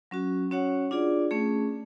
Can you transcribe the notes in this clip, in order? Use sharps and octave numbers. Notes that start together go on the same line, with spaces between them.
F#3 C#4 F#4
C#4 F#4 C#5 F#5
D4 F4 G#4 D5
A3 C#4 G#4